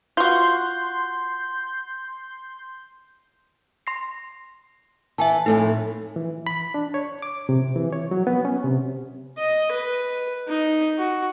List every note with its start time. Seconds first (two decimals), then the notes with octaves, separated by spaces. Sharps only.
0.17 F4 F#4 C6 G6
3.87 C6 A#6 C7
5.18 E3 E5 G#5 A5
5.46 F2 A2 A3 D#4
6.16 E3
6.47 B5
6.74 D4
6.94 C#5
7.22 D6
7.49 C3
7.76 E3
7.92 C#5
8.11 F#3
8.27 B3
8.45 C#4
8.64 C3
9.38 D#5
9.72 B4
10.49 D#4
10.99 F#4